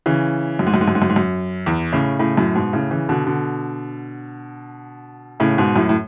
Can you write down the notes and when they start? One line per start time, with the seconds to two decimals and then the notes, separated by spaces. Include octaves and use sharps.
0.06 C#3 E3
0.59 F#2
0.66 G#2
0.74 F#2
0.81 G#2
0.88 F#2
0.95 G#2
1.02 F#2
1.09 G#2
1.16 F#2
1.66 E2
1.93 A2 C#3
2.19 A2 C#3
2.37 F#2 A2
2.55 G#2 B2
2.73 A2 C#3
2.91 C#3 E3
3.09 B2 D3
3.26 B2 D3
5.40 A2 C#3
5.58 G#2 B2
5.76 F#2 A2
5.89 A2